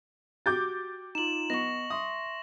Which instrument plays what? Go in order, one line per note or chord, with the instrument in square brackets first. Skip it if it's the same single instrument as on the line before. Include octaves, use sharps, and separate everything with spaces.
[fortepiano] F#4 G4 [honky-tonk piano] D6 G6 A6
[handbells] D#4 F4 [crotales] E7 F#7
[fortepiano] B3 [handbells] D#5 C#6 [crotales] A#6 F#7
[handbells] E5 C6 C#6 [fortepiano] D#6